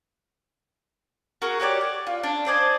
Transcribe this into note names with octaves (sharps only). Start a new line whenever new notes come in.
F#4 G#4 A#4 C#6
F#4 G4 C#5 D5
D5
F4
D4
C5 D5 D#5 G#5